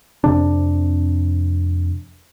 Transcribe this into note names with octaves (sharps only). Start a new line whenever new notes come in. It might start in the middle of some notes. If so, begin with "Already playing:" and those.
F2 C3 D4